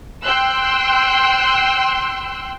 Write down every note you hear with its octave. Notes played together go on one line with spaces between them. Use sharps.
G5 C6 E6 F#6